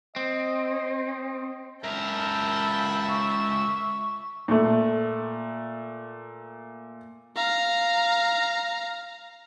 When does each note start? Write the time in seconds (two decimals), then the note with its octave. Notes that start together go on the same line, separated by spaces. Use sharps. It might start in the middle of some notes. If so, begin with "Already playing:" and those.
0.16 C4 D#5
1.84 C#2 A#4 E5 G5 A5 B5
3.09 C#6
4.48 A#2 A3
7.36 F5 A#5